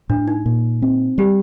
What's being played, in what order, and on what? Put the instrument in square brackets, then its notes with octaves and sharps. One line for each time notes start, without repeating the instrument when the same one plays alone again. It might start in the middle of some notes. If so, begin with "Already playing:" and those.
[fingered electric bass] A2 [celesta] D4
[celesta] D#4
[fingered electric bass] A#2
C4
[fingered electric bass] G3 [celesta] G4